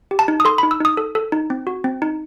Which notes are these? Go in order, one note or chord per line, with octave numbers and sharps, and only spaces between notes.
G4
A5
D#4
D#6
A4 C6
D#4 B5
E6
D#4 D#6
A4
A4
D#4
C4
F#4
C4
D#4